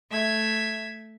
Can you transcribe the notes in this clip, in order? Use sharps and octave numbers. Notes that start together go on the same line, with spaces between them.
A3 E5 G#6